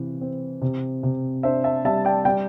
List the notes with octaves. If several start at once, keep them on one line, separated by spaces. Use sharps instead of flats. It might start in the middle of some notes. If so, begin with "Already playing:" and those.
Already playing: C3 E3
C4
C3
C3
D4 C5 E5
E5 A5
G3 E5 A5
D5 G5
G3 D5 G5